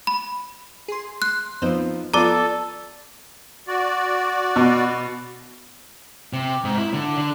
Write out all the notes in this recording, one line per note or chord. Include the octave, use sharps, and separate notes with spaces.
B5
G#4 C6
C6 F#6
F3 B3 C4 D#4 C5
F3 B3 F4 A4 D5 A#5 D6
F#4 D5
B2
C3
G#2
E4
D3
D3